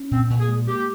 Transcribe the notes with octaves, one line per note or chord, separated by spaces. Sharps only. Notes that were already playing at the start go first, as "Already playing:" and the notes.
Already playing: C#4
A#2 C4
A#2
G#4
G#3
A#3 G4